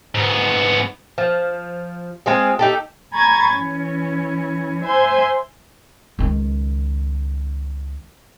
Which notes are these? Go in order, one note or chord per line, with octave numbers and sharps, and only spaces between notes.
G#2 B3
F3
G#3 C4 F4 G#4
D#4 G4 A4
G#5 A#5 B5 C#6 G#6 A6
E3 C#4
C5 E5 G#5 C6
C#2 D#3